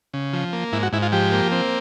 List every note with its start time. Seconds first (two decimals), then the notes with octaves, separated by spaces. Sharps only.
0.14 C#3
0.33 F3
0.53 A#3
0.73 G#2 E4
0.83 F#4
0.93 G#2 E4
1.02 F4
1.12 F3 G4
1.32 A#3
1.52 C4